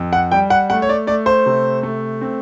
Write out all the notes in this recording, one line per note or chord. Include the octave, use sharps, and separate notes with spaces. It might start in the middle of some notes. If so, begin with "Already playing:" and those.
Already playing: F2
F#5
G3 G5
F#5
A3 F#5
C#5
D5
A3 D5
C5
C3
A3
C4